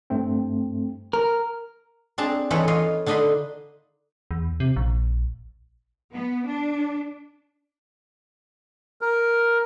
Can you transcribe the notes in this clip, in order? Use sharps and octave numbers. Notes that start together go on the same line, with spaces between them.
G2 A3 C4
A#4
C4 D4 G#4 A5 A#5
E3 D#4 F4 A4 B4 C#5
F4 C#5 D#5 F5
D3 D4 D#4 D#5 B5 C6
E2
C3
A#1
B3
D4
A#4